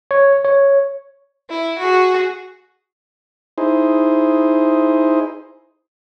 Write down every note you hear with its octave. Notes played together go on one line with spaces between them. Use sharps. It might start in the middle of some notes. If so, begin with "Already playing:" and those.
C#5
C#5
E4
F#4 G#4
D#4 E4 G#4 C5